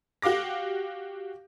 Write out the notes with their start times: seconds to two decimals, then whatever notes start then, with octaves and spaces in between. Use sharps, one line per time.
0.22 F#4 G4 F5 D6 A#6